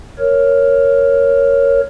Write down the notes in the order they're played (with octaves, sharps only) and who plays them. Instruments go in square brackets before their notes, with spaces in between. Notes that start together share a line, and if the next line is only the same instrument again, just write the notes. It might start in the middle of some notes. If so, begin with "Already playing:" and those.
[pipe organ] A#4 C#5